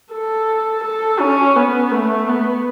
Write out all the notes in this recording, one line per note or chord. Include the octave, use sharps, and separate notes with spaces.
A4
A4
C#4
B3
A3
B3